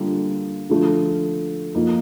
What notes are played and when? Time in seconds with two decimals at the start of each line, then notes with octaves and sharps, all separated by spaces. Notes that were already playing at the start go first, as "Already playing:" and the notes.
Already playing: D3 G3 A#3 F4 A4
0.70 D3 F3 A3
1.75 F3 A#3 D#4